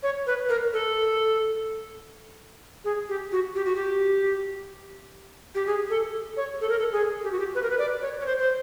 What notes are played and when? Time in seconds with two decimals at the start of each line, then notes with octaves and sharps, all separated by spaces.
0.03 C#5
0.27 B4
0.49 A#4
0.73 A4
2.85 G#4
3.09 G4
3.32 F#4
3.55 G4
3.65 F#4
3.76 G4
5.55 G4
5.67 G#4
5.90 A4
6.37 C#5
6.61 A4
6.69 A#4
6.79 A4
6.92 G#4
7.24 G4
7.32 F#4
7.39 G4
7.55 B4
7.62 A#4
7.70 B4
7.79 D5
8.02 C#5
8.20 C#5
8.26 C5
8.39 C5